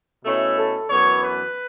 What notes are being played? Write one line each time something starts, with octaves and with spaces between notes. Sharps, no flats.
B2 A3 C#4 E4
A4
F#2 E3 B3 D4 C#5
B4